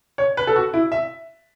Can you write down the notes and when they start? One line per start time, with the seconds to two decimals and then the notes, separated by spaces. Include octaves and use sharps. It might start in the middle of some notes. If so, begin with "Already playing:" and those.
0.18 C#5
0.37 B4
0.47 A4
0.56 F#4
0.74 E4
0.92 E5